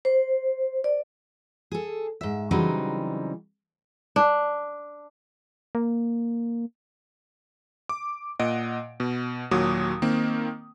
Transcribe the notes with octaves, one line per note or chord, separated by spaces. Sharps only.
C5
D5
G#4 A4
G#2 E5
C#3 E3 F#3 G3 C4 D#4
D4
A#3
D6
A#2 D#5 F#5 D7
B2
D#2 A#2 F#3 F#4 D6 D#6
D#3 A#3 C4